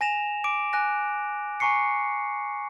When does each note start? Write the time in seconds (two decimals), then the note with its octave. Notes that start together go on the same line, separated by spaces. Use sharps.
0.01 G#5 A#6 E7 F7
0.44 D6 D7
0.73 G#5 F#6 A#6
1.60 G#5 A#5 C#6 C7 C#7